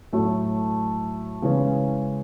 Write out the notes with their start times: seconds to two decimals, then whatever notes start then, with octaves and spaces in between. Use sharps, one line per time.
0.13 A2 F#3 A3
1.42 C#3 E3 G#3 C#4 E4